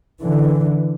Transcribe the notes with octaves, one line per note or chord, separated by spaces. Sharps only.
D3 E3